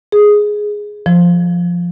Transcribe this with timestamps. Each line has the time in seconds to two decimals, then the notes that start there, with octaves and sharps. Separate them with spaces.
0.12 G#4
1.06 F3